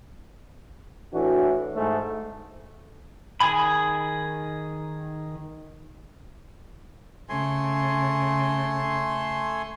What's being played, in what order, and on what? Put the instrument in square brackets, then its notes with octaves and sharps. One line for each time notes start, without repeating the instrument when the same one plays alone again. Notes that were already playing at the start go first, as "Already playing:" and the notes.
[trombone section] A2 E3 D4 F#4
G#2 A3
[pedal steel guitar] D#3 G#4 G#5 B5
[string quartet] C#3 [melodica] A3 G#5 C6